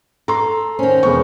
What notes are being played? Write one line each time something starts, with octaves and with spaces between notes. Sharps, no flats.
A4 A#5 C6
D#3 C#4 C5
E1 B3 C#6